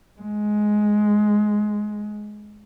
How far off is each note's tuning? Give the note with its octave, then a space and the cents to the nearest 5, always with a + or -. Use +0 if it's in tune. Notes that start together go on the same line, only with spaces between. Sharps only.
G#3 +10